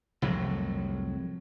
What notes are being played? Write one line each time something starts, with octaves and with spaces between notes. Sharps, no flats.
C2 F2 A2 F#3